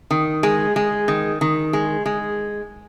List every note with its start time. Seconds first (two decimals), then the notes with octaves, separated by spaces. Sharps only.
0.11 D#3
0.43 G#3
0.76 G#3
1.08 D#3
1.41 D#3
1.73 G#3
2.06 G#3